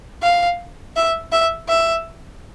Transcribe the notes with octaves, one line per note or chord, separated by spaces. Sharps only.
F5
E5
E5
E5